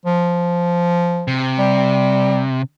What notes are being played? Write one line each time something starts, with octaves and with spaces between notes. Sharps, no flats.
F3
C3
G3